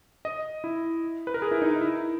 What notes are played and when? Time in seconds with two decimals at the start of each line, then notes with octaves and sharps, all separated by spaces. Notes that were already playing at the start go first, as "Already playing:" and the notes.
0.25 D#5
0.64 E4
1.27 B4
1.34 A#4
1.42 G#4
1.51 E4
1.62 D#4
1.71 E4
1.81 E4